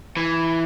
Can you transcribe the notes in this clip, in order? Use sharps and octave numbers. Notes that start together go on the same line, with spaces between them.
E3